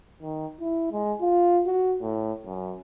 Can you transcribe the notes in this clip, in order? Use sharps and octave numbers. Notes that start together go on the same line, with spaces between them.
D#3
E4
G#3
F4
F#4
A2
F#2